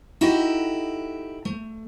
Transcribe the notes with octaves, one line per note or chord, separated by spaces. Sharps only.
D#4 E4 F#4 G4 A4 D#5
A3